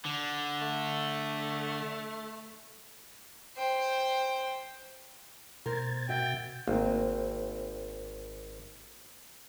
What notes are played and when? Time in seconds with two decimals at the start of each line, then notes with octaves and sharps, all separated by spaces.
0.05 D3
0.62 A3
3.58 C5 G5
5.66 B2 A#4 C5 G#6 A6
6.09 F#4 E5 G5
6.68 G#1 A#3 C4